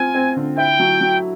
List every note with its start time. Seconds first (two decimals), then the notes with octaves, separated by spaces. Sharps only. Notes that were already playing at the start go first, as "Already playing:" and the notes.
Already playing: C4 F4 G#5
0.15 C4
0.37 D3
0.57 E4 G5
0.80 F#3
1.01 F#3